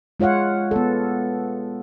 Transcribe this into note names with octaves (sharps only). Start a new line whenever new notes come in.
G#3 F4 C#5 F5 F#5
B3 A4